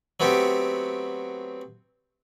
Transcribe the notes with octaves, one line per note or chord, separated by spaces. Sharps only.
F#3 A3 B3 C4 G4